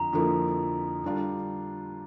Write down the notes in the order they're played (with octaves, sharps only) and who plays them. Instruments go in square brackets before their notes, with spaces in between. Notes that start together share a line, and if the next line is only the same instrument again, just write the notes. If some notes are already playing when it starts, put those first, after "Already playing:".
Already playing: [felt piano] F2 D3 [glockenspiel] A#5
[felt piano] F2 D3 F3 A#3 E4
D3 G3 D4 F4